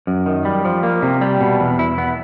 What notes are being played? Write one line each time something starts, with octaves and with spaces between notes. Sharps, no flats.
F#2
D#3
G3
F3
A#3
C3
G3
B2
E2
E4
B3